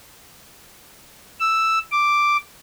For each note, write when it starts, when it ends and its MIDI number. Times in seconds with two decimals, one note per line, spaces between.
1.40 1.78 88
1.92 2.37 86